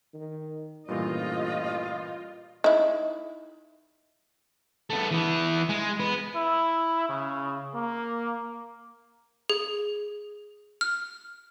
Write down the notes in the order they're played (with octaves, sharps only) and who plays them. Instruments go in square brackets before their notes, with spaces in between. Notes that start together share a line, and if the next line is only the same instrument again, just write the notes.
[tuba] D#3
[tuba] A1 [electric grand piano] G2 A#2 E3 [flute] F4 [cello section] D#5
[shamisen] D#4 E4
[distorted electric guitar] A3 B3
E3 B3
G#3
B3
[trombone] E4
C#3
A#3
[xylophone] G#4
F6